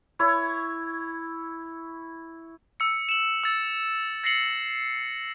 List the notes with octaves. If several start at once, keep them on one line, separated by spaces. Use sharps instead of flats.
E4 C#5
E6 C#7
E7 F#7
E6 A6
A6 A#6 C7 C#7 F#7